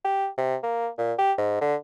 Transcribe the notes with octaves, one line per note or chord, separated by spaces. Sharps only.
G4
C3
A#3
A#2
G4
G#2
D3